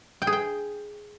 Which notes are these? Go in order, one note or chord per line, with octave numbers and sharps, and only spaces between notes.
G5
G#4
G5